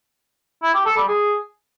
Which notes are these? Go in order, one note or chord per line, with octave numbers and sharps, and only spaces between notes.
E4
G4
A4
G3
G#4